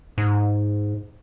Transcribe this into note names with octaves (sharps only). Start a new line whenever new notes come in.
G#2